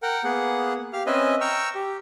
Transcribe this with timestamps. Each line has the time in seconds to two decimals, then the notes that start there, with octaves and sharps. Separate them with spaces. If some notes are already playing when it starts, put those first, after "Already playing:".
0.03 A#4 F#5 G5
0.24 A#3 B3 G#4 F#5
0.93 G4 F5 F6
1.06 C4 C#4 B4 D#5 E5 G#5
1.41 G5 A#5 C#6 E6 F6
1.75 G4